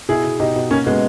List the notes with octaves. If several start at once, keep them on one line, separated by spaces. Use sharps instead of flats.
B2 E4 G#4
B2
B2 D#4 G4
B2
B2 A#3 C#4
B2 G#3 B3